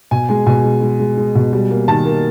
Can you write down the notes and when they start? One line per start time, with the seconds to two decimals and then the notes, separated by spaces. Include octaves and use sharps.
0.11 B2 G#5
0.29 G#3 G#5
0.46 B2 G#5
0.64 G#3
0.82 G#3
1.00 G#3
1.18 G#3
1.35 B2
1.53 G3
1.71 A#3
1.88 D#3 A5
2.06 A#3